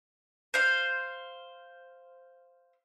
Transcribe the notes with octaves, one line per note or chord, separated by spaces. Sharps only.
C5 F5